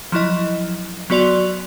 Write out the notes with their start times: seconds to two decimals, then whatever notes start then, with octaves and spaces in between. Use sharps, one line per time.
0.12 F3 F#3 E4 D#5
1.10 F#3 B3 F#4 D5 C6 F7